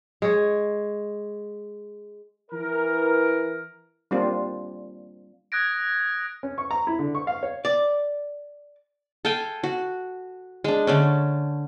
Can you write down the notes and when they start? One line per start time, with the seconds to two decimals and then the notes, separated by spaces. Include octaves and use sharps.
0.22 G#3 C#5
2.51 E3 A#4
4.11 G3 A#3 C4 D4 F4
5.52 D#6 F#6 G#6 A#6 D7
6.43 C#4
6.58 C#6
6.71 A#5
6.87 E4
6.99 D3
7.15 C#6
7.27 F5
7.43 C#5
7.65 D5
9.25 A4 F5 G5 G#5
9.63 F#4
10.64 G#3 D4
10.87 D3 A3 C#4